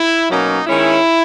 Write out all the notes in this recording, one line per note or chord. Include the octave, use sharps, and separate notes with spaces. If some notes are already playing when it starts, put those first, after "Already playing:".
Already playing: E4
B2 F#3 A#3 C#4 D#4
D#3 G#3 C#4 E4